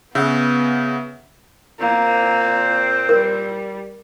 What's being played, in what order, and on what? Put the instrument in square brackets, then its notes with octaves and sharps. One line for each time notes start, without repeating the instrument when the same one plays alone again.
[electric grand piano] C#3 [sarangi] B3 [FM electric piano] E5 F#5
[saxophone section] A#2 C4 [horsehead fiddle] A#3
[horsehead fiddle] G3 [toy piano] A#4